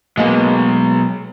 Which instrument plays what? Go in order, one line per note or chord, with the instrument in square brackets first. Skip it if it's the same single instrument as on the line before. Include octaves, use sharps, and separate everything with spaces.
[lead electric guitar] B2 F#3 [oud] G#3 A#3 G#4